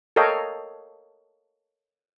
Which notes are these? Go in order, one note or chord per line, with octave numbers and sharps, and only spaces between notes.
A4 A#4 C#5 D#5 F5 G5